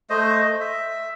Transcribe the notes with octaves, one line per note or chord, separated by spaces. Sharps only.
A3 C5 D#5
E5